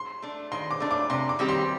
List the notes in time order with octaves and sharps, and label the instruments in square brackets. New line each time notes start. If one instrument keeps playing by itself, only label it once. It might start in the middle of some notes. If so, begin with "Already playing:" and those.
Already playing: [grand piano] C6
[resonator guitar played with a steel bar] A3 D4
[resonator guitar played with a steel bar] D#3 [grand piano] C6
[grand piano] D6
[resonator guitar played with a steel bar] A3 D4
[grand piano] D6
[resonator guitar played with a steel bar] C3 [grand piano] C6
[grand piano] D6
[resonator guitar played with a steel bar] D#3 G3 C4 G4
[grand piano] C6